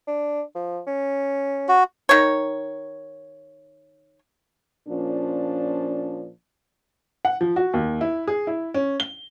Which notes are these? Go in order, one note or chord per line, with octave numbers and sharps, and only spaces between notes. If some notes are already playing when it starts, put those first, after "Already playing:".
D4
F3
C#4
F#4
D#3 C#5
A#2 F3 C#4 D4
F#5
F3
F#4
D#2
E4
G#4
E4
C#4
G7